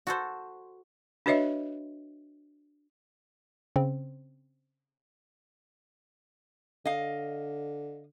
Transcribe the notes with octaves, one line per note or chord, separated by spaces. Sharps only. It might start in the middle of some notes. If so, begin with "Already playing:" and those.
F#4 A4 C5
D4 F#4 B4 C#5 D#5 E5
C#3 C4
D3 D#5 F5